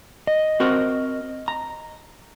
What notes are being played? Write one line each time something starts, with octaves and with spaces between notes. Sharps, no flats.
D#5
C4 F#4 A#4
A#5